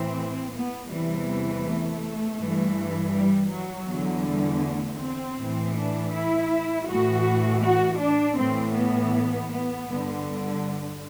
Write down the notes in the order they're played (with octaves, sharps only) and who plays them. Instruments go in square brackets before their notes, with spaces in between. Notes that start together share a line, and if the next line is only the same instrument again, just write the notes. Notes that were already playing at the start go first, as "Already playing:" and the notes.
Already playing: [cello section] A2 E3 C4
B3
E2 C3 E3 G3
A3
G2 E3
G3
F#3
E2 D3
G3
A3
C4
A2 E3
D4
E4
A2 E3 F#4
F#4
D4
A2 E3 C4
B3
B3
G2 D3